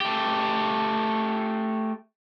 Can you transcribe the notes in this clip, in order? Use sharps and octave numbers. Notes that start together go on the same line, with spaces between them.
A3 G4